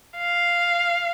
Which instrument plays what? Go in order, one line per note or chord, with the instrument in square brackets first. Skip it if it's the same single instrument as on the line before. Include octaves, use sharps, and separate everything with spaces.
[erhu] F5